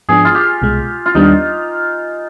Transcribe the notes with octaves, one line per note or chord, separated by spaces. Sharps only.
G#2 F3 B3 D4 G#4
F4
G4
C2 B2 G#3
F4
D#2 D#3 G3 B3 D4 D#4